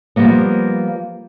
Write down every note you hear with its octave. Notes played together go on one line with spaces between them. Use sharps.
F3 G3 A#3 B3